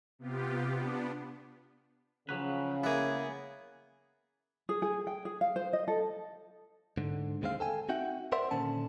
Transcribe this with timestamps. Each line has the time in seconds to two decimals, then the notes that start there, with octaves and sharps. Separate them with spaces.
0.19 C3 B3 F4 G4
0.70 B3 D4
2.29 C#3 F3 F#3 B4
2.84 A#3 B3 E4 G#4
4.69 G#4
4.82 G#4
5.07 G5
5.25 G#4
5.41 F5
5.56 C5
5.73 D#5
5.88 A4
6.97 G#2 D3
7.42 D#2 D#3 G#3 C4 F5
7.60 A4 G5 G#5
7.89 C4 D#4 F#4 E5 F#5 G5
8.32 A#4 C5 D5 E5 F#5 C6
8.51 A#2 D3 D#3 C#4 A5